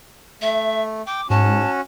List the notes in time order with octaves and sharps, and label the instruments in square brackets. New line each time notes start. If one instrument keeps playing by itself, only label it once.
[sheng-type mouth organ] A3 [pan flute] E5
[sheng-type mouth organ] G5 [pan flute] D6
[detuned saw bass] G#2 [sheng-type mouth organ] C#4 F#4 [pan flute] A5